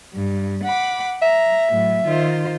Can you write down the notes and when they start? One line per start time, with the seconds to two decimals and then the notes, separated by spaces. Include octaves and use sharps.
0.14 G2
0.63 F#5 B5 D6
1.22 E5 A#5
1.71 A2 F#3
2.06 D#3 F4 C5